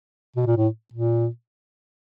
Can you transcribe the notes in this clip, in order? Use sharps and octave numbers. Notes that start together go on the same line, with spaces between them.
B2
A#2
A2
A#2